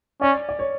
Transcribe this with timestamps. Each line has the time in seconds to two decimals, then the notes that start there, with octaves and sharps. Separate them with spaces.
0.21 C#4 D5
0.49 D5
0.59 C#5